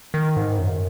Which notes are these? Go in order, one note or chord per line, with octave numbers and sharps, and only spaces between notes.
D#3
G#2
F#2